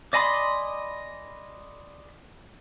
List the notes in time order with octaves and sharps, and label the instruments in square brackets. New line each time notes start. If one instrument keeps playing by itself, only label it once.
[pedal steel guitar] D5 D#5 G#5 B5 C6